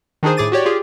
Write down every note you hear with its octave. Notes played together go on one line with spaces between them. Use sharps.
D#3 D4 D#4 G#4 C5
A2 G#4 D6 A6 D#7
F#4 G4 C#5 D5
F4 G4 G#4